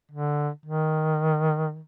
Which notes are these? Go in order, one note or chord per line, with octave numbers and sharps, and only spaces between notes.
D3
D#3